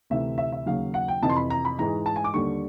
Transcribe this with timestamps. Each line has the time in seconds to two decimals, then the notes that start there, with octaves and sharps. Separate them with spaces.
0.10 D2 C3 E3 E5
0.38 E5
0.52 E5
0.66 D#2 C#3 F#3 F5
0.94 F#5
1.08 G5
1.22 F2 C3 E3 A5
1.30 C6
1.36 B5
1.50 A#5
1.65 B5
1.79 G#2 E3 G#3 A#5
2.06 A5
2.16 G#5
2.24 D6
2.34 D#2 D3 G3 C#6